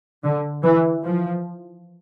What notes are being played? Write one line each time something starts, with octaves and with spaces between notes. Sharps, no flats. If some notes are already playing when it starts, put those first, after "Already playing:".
D3
E3
F3